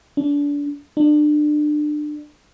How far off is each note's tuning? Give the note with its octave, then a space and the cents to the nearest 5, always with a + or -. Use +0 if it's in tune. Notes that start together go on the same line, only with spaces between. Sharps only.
D4 -30
D4 +30